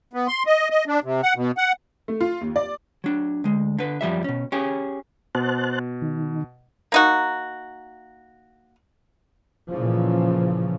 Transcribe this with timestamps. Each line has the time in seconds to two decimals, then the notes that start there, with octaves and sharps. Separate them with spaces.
0.13 B3
0.28 C6
0.46 D#5
0.70 D#5
0.87 D4
1.04 C3
1.23 F#5
1.36 B2
1.58 F#5
2.08 A3
2.21 F4
2.41 D#2
2.56 D5
3.04 F#3 D4
3.44 D2 G#3
3.78 D3 B4
4.01 F#2 F3 G3 E5
4.24 B2 C#4
4.52 C#4 G4 G#4
5.35 B2 C5 A5 F#6
6.02 D#3
6.92 A#3 D#4 F#4
9.70 A#2 C#3 E3 F3